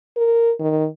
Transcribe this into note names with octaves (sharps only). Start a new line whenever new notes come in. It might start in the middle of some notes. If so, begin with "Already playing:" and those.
A#4
D#3